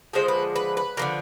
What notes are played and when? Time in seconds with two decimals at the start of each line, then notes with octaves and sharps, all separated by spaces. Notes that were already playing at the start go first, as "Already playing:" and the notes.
0.13 D3 F3 G#3 C5
0.28 B4
0.56 B4
0.77 B4
0.97 D3 F3 A#3